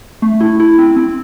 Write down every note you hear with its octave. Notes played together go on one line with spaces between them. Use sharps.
A3
E4
E4
C4
C4